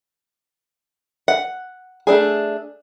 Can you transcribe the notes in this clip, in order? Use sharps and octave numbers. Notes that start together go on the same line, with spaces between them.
F#5
A3 D4 G#4